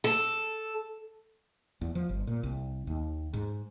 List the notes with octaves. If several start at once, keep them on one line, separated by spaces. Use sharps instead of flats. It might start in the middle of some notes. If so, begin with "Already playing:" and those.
A4
E2
F3
G1
A#2
C2
D#2
G#2